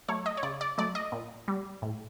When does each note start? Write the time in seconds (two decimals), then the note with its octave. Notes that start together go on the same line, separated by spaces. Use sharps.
0.08 F#3 A3 C#5
0.26 D#5
0.37 C#5
0.43 C#3 D5
0.61 D5
0.78 F#3 A3 D5
0.95 D#5
1.12 A#2
1.48 G3
1.82 A2